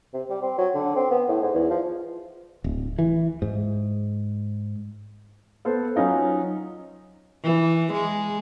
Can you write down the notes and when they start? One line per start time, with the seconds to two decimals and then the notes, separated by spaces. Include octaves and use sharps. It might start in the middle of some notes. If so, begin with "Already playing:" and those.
0.13 C3
0.30 G3
0.42 C4
0.58 F#3
0.75 D3
0.96 C4
1.11 B3
1.29 A2
1.42 G#2
1.55 E2
1.70 F3
2.64 D1
2.99 E3
3.42 G#2
5.65 B3 A4 C5
5.96 F#3 C#4 D#4 F4
7.44 E3
7.93 G#3